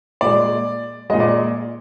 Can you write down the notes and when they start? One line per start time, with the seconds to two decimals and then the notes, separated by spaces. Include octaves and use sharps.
0.21 A#2 G#3 D5
1.10 A#2 G#3 D#5
1.20 D5